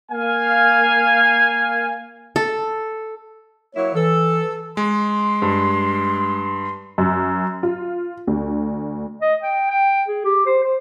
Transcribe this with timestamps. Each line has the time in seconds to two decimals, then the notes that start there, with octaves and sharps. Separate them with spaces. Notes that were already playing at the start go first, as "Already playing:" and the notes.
0.12 A#3 F5 G#5
2.36 A4
3.75 F#3 A#3 E4 C#5
3.95 E3 A4
4.77 G#3 C6
5.42 G2
6.98 F#2
7.63 F4
8.27 D2
9.21 D#5
9.42 G5
9.70 G5
10.08 G#4
10.25 G4
10.46 C5
10.63 C5